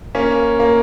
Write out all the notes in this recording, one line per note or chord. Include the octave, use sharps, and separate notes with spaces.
A#3 C#4
A#3